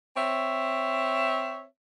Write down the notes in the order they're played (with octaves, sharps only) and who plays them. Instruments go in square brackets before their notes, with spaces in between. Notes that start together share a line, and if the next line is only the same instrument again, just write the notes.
[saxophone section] C4 C#5 E5